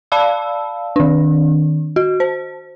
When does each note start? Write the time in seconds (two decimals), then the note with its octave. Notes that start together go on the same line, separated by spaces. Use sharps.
0.12 D5 F5 A5 B5 E6
0.96 D#3 D4
1.96 F#4
2.20 C5